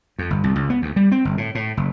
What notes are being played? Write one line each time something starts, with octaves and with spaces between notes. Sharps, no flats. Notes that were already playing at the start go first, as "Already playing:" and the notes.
F2
G1
C2
C#2
B3
D2
G3
C4
G1
A2
A2
F#1